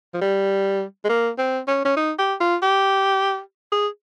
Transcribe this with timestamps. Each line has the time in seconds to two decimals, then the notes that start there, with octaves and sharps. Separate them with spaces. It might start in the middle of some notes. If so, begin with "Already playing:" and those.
0.14 F3
0.21 G3
1.04 G#3
1.09 A#3
1.38 C4
1.68 C#4
1.85 C#4
1.97 D#4
2.18 G4
2.41 F4
2.62 G4
3.72 G#4